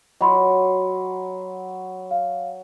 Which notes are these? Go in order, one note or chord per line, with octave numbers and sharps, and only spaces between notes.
F#3 D#5 B5 C6
F5